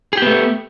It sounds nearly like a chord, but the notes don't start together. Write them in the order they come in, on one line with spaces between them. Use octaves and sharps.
G#4 G4 B3 A3